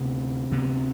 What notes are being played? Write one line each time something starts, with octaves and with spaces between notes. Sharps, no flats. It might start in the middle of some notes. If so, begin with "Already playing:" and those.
Already playing: D2 C3 B3
D2 C3 G3 B3